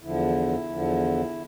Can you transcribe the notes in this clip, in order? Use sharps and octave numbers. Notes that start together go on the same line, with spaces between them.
E2 D3 F3 E4
E2 D3 F3